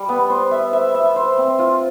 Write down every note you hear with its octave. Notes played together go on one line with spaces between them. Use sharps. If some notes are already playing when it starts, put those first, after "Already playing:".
Already playing: G3
B3
C5
E5
E5
E5
C5
C4
F4